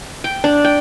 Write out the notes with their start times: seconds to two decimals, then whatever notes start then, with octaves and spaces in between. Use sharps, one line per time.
0.24 G5
0.44 D4
0.65 G5